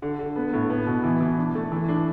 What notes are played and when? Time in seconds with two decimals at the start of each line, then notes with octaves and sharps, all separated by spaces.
0.02 D3
0.19 D3
0.36 B3
0.53 A2
0.70 B3
0.87 B2
1.04 E3
1.21 E3
1.38 D4
1.55 A3
1.72 E3
1.89 D4